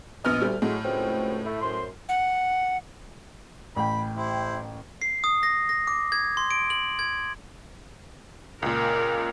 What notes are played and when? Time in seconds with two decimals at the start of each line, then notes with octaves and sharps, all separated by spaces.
0.25 A#1 B3 D#5 F6
0.42 D2 G3
0.62 A2 F#3 G#3
0.84 C#2 F#3 C4
1.46 A3 E4
1.61 F#2 C5 C6
2.09 F#5
3.76 A1 G5 B5
4.15 E4 G4 C5
5.02 C7
5.24 D#6
5.43 A#6
5.69 A#6
5.87 D6
6.12 G#6
6.37 C6
6.51 D7
6.70 F#7
6.99 G#6
8.62 C#2 A#2 A#4